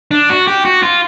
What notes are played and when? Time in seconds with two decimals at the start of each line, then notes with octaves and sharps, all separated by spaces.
0.11 D4
0.30 F#4
0.48 G4
0.65 F#4
0.83 F4